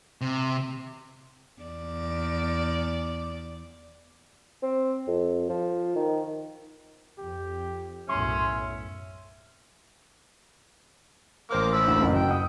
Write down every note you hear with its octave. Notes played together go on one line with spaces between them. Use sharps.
C3
E2 D5
C4
F2
F3
D#3
F2 G4
B1 F#2 A2 C#4 E5 C6
A1 A#3 C5 D6 F6
F3 B5 E6
D2
F#1 F#4
G5
F#5 D#6